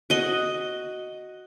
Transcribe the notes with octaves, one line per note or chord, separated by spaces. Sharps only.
F#4 D#5